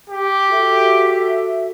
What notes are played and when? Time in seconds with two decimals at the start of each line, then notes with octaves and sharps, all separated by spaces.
0.09 G4
0.47 F#4 A4 E5